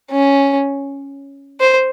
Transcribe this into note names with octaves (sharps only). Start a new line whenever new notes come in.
C#4
C5